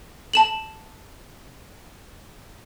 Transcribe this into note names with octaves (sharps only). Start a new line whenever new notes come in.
A5 E7 F#7